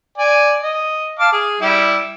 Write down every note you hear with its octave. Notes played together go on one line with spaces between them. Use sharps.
D5 G#5
D#5
F5 A5 D6
G#4
G3 E4 G4